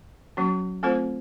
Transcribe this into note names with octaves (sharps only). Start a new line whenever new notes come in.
F#3 A#3 C#4 F#4
A3 C4 F4 A4 C5